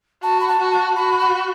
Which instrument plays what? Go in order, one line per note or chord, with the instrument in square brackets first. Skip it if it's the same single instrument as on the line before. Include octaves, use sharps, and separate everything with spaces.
[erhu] F#4 [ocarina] A5
[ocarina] B5
A5
[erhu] F#4
[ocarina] A5
[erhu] F#4 [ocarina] B5
[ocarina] B5